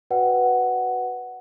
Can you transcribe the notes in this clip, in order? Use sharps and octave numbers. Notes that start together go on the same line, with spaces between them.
F#4 B4 D5 F#5 G5